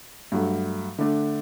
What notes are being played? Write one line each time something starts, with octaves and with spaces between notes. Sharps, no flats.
G2 F#3 A3
D3 A3 D4